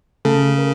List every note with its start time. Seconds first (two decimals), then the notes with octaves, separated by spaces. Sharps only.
0.25 C#3 A3 A4
0.58 A#4